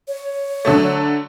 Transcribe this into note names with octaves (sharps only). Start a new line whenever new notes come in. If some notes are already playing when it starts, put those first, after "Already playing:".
C#5
D3 F#3 A3